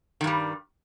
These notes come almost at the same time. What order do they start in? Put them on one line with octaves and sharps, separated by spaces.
D#3 G2 G3